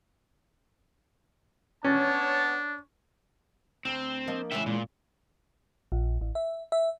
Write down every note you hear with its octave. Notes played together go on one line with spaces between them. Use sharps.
B3 C#4 D4 C#5 A5
D2 C4
F3 A#3 D#5
C#3 E3 G#3 E5 G5
A#2
A#1
A1
E5
E5